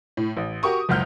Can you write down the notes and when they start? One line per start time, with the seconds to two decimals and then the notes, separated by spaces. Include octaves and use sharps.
0.17 A2
0.37 A1
0.63 F#4 G4 A#4 C#6 D#6
0.89 F#1 C#2 F#5 F6 G6